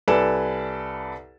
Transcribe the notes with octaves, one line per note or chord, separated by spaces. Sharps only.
C2 A4 B4 D5 G#5 E7